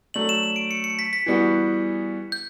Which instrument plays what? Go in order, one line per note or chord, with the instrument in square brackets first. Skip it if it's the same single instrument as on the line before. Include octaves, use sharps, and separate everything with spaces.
[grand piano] F#3 A3 D4 [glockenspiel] F#7
[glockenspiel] E7
E7
D7
C#7
C#7
B6
B6
[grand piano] E3 G3 B3 F#4
[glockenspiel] G6